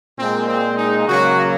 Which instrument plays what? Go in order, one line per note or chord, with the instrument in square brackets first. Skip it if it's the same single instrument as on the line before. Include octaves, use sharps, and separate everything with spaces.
[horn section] A#2 G#3 C4
C4
D#4
C#3 F#3 A#3 F#4